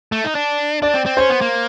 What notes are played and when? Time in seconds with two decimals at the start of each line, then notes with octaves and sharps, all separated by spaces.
0.12 A3
0.24 D#4
0.35 D4
0.82 D4 D5
0.94 C4
1.06 C4
1.17 C#4 C5
1.30 B3
1.41 A#3